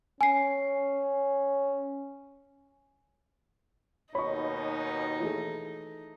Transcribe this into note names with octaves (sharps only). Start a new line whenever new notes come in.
C#4 G#5 C7
D#2 B2 D#4 C#5 D#5 B5 C#6
E3 A3 G#4